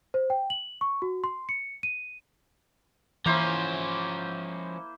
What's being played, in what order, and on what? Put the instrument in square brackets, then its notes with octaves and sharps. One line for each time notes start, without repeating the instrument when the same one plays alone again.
[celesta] C5
G5
F#7
C#6
F#4
C6
C#7
D#7
[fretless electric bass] E3 [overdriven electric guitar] F3 C#4 [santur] A#3 E4 C5